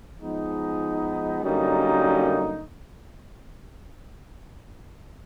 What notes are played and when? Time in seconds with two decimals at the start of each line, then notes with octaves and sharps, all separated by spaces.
0.20 F3 G#3 B3 D#4
1.43 F#2 D3 G3 A#3 D#4